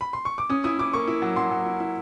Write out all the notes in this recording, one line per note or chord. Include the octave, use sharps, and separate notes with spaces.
B5
C6
C#6
D6
C#4 D#6
E4 D#6
E4 D6
A#3 C#6
E4
F#3
F#3 C6
F#3
E4
E4